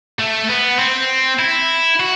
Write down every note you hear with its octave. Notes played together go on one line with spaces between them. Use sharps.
A3
B3
C4
E4
F#4